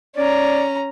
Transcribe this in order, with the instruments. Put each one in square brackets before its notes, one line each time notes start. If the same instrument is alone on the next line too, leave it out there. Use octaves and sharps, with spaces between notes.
[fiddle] C#4 A#5 [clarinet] D5